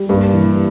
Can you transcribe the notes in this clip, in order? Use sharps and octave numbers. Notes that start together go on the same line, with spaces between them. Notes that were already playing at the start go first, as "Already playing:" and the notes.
Already playing: G3
G2 A#3
E3